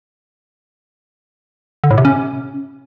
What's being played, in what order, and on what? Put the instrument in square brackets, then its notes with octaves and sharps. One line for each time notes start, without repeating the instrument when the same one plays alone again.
[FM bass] D3
A2
C3
C#4